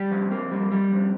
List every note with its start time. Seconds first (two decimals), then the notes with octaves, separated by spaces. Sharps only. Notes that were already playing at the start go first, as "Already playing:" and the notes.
Already playing: G3 G4
0.11 F2
0.31 A#3
0.51 G3
0.72 G3
0.92 F2